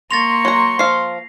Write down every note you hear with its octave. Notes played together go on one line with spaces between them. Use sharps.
A#3 C6 C#6 A6 A#6 F7
F#3 A#5 C6
F3 F5 C7